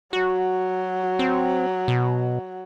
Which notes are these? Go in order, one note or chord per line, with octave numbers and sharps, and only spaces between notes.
F#3 F#4
C4
B2